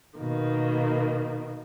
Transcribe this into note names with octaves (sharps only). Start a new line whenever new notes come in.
B2 D#3 A#3